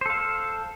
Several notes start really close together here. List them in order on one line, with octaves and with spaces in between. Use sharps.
C5 A4 F5